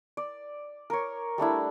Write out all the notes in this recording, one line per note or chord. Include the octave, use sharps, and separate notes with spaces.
D5
A#4 C#5
G3 A3 D4 E4